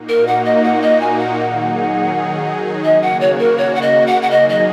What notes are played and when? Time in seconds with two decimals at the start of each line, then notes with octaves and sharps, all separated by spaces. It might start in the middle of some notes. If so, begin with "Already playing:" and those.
Already playing: A#2 A#3 D#4 F#4
0.09 A#4
0.27 F#5
0.45 D#5
0.64 F#5
0.82 D#5
1.01 G#5
1.18 F#5
1.38 D#3 F#3 D#4 G#4
2.84 C#3 A#3 F#4 D#5
3.02 F#5
3.21 C#5
3.39 A#4
3.58 C#5
3.75 F#5
3.82 D#5
4.07 F#5
4.22 F#5
4.31 D#3 F#3 D#4 G#4 D#5
4.49 D#5